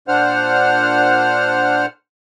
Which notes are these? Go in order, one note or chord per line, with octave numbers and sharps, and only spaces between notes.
A#2 D4 C5 F#5 F6